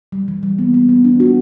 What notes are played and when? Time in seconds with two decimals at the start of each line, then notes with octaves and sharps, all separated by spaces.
0.12 G3
0.28 E3
0.43 G3
0.59 B3
0.74 B3
0.89 B3
1.05 D4
1.20 F#4